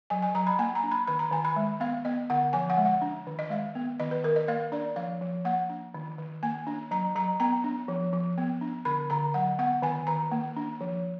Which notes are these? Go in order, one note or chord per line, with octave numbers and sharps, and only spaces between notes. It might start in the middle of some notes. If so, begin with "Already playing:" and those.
F#3 G#5
G#5
F#3 A#5
B5
A#3 G#5
A#5
D4
B5
D#3 B5
A#5
D#3 G#5
B5
G#3
B3 F5
B3 D#5
D3 F#5
F3 G#5
F#5
G#3
F#5
D4
D#3
D#5
G#3 F5
B3
D#3 D#5
B4
D#3 A#4
D#5
A#3 F5
D4 D5
F3 F5
F3
A#3 F#5
D4
D#3
D#3
A#3 G#5
D4
F#3 A#5
F#3 A#5
B3 A#5
D4
F3
F3
B3
D4
D3 B5
D3 A#5
F#3 F#5
B3 F#5
D#3 G#5
D#3 A#5
A#3
D4
F3